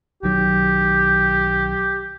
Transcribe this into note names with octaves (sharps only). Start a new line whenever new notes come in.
B1 D#3 F#3 G4